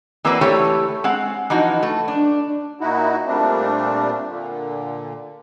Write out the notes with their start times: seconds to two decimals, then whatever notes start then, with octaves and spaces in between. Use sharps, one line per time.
0.24 E3 A#3 C4 F#4 B4 D5
0.41 E3 A3 G4 C#5
1.04 G#3 C4 F#5
1.50 E3 F3 D#4 F#4
1.83 A3
2.08 D4
2.81 A#2 D#4 E4 F#4
3.27 A#2 G3 A3 C4 D4
4.29 A#2 D3